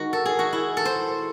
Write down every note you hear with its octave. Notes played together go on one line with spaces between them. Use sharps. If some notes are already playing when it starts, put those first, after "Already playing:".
Already playing: D#3 G#3 D#4 F#4
A4
G#4
F#4
E4
A4
C5